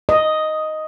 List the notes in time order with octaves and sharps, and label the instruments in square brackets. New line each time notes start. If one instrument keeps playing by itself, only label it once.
[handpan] D#5